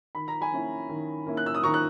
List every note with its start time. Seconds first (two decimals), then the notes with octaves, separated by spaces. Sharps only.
0.15 D#3 B5
0.28 A#5
0.41 G#5 B5
0.52 A#3 C#4 E4
0.89 D#3
1.26 A#3 C#4 E4
1.37 F#6
1.46 E6
1.55 D#6
1.64 D#3 A#5 C#6
1.74 F#6